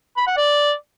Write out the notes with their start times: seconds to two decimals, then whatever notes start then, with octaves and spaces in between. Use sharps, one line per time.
0.17 B5
0.27 F#5
0.37 D5